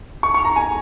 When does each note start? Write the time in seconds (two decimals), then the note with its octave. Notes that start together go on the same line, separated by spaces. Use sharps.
0.23 C#6
0.34 C#6
0.45 A#5
0.56 G#5